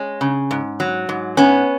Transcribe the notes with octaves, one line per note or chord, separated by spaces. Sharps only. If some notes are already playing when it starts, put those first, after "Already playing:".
Already playing: G#3 C#4
C#3
G#2
F#3
G#2
B3 C#4